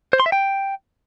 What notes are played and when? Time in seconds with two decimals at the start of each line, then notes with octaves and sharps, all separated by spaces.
0.13 C5
0.20 C6
0.26 E5
0.32 G5